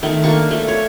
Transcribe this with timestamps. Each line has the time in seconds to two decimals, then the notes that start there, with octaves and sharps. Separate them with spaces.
0.03 D#3 A3
0.24 A#3 D4 C#6
0.51 A3
0.68 C#5